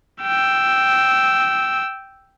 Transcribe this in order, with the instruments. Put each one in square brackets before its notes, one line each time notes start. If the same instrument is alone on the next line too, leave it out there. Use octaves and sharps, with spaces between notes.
[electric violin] G5 E6